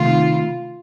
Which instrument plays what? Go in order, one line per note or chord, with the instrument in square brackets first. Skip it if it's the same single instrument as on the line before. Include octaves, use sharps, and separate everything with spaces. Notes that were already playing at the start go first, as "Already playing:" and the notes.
Already playing: [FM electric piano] C3 D#3 A3 [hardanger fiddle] F4